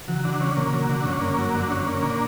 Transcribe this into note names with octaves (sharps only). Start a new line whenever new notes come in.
C#3 E3 F#3
D3
C#4
A#2 C#3 A#3
F#3
B2
D3
F#2 C#4
G2
F#2 A#3
F#3
F#2 D3
C#4
F#2
A#3
A#2 D3